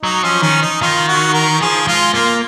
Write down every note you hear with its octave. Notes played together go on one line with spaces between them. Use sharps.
F#3 D#4
F3 C#4
D#3 C#4
D#4
D#3 F4
F#4
A#4
F3 G#4
G#3 F4
A#3 F4